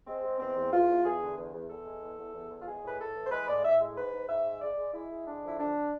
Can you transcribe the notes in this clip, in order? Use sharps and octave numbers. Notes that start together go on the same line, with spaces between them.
G#3 C4
G#3
E2 C4
E2
E2 F4
E2
E2 G#4
D3
E2
E2
E2 A4
G#3
E2
E2
E2
E2
F4
G#3 G#4
A2 B4
A2 A4
E3
C5
G#3 B4
A2 D5
A2 E5
G#3
G#2 B4
G#2
G#2 E5
G#3
G#3 D5
G#3
G#3 E4
G#3
D3 D4
F2 E4
D3 D4